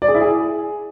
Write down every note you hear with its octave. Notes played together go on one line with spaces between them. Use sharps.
D5
G#4
E4
G#4